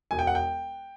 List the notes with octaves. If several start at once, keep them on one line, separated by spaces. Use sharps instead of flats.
E1 G#5
G5
F#5
G5